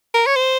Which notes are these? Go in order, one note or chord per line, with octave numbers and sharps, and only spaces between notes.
A#4
C#5
C5